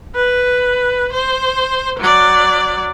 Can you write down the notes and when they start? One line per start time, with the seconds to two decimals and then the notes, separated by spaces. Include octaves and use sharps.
0.15 B4
1.13 C5
1.99 F#3 D5